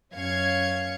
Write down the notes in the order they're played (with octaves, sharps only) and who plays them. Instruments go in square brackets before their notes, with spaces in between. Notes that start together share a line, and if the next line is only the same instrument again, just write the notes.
[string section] F#2 C#4 F5 G#6 C#7